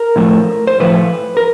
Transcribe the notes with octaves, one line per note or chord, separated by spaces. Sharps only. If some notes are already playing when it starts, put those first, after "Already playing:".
Already playing: A#4
A2 F3 A3
C5
A2 F3 A3 B4
A#4